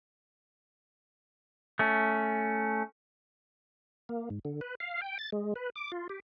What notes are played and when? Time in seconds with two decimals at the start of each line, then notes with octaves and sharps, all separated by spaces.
1.79 A3 C#4
4.09 A#3
4.30 G#2
4.45 D3
4.61 B4
4.80 F5
5.02 G5
5.19 A6
5.32 G#3
5.55 B4
5.76 D6
5.92 F4
6.09 G4